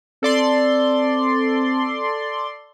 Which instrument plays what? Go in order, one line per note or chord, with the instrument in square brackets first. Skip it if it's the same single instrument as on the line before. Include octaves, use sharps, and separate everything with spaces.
[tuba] C4 [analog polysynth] A4 D5 C6